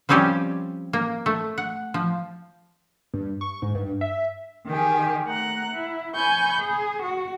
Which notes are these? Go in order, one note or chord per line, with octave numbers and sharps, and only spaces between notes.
F3 G3 C4 C#4 F4 G4
A#3
A3
F#5
F3
G2
C#6
G#2
G2
E5
D#3 G4 G#4
A3 F#5 A#5 F#6
E4
G#5 B5 C#6 G6
G#4
F#4